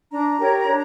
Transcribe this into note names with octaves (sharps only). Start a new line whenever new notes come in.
D4 A#5
G4 A#4 C#5
D4